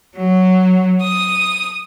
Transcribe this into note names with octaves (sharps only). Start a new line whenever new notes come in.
F#3
D#6